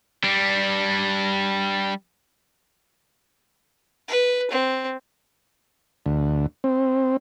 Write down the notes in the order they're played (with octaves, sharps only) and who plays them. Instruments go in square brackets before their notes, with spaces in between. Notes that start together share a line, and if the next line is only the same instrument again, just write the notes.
[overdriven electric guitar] G3 D4
[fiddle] B4
C4
[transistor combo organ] D2
C4